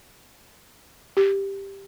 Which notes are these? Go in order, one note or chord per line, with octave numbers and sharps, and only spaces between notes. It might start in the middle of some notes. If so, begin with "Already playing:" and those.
G4